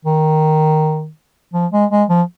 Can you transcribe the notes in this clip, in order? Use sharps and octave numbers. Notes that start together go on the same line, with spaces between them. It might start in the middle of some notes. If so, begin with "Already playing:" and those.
D#3
F3
G#3
G#3
F3